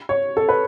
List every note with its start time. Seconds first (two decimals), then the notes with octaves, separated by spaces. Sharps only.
0.09 C#5
0.37 A4
0.49 B4